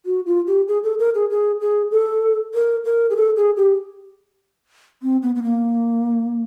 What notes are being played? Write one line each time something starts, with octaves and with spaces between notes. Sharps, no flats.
F#4
F4
G4
G#4
A4
A#4
G#4
G#4
G#4
A4
A#4
A#4
G#4
A4
G#4
G4
C4
B3
B3
A#3